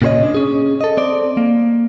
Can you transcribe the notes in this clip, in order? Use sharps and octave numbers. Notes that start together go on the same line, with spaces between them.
A#2 C#3 G4 C5 C#5 D#5
D4
C#4 G#4
A4 D#5
C4 D5
A#3